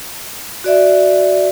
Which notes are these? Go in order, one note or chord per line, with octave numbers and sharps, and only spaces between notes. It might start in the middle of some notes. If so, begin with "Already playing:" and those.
F#4 D5 E5